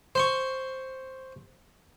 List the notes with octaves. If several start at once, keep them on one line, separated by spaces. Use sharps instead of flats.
C5 C6 C#6